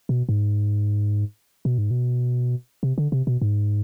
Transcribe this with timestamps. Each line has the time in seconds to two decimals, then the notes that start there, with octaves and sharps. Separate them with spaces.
0.09 B2
0.29 G#2
1.65 B2
1.78 G#2
1.91 B2
2.83 C3
2.98 D3
3.12 C3
3.27 B2
3.42 G#2